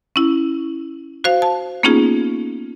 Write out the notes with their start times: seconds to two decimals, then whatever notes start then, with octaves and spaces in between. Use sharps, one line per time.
0.16 C#4 E4
1.24 F#4 C5 F5
1.42 A5
1.83 A#3 B3 C#4 D#4 F4 G#4